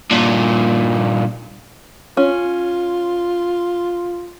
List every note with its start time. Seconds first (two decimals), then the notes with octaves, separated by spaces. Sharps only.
0.11 G2 A#2
2.17 C#4 F4